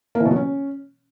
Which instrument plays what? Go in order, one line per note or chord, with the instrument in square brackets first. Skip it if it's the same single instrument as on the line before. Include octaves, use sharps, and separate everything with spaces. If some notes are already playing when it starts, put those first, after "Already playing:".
[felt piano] A#3
E3
B2
F#3
C#4